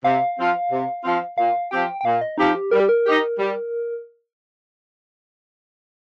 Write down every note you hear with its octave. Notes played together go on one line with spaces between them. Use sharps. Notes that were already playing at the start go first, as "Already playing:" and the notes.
C3 F5
F3 C4 F4
C3
F3 C4 F4
A#2 F5
F3 C4 G4 G5
G5
A#2 F5
D#5
F3 C4 D#4 G4
G4
G3 A#4
G4
A#4
D#4 G4
G3